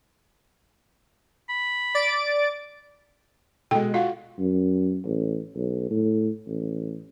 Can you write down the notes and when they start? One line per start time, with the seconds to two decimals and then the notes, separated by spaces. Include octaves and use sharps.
1.49 B5
1.95 D5 A6 D7
3.71 B2 G#3 A4 G5
3.94 F4 F#4 F5
4.39 F#2
5.05 A1
5.56 B1
5.90 A2
6.47 A1